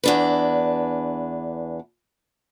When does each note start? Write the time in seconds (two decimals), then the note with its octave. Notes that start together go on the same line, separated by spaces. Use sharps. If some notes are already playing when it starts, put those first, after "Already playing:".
0.04 E2 D4 B4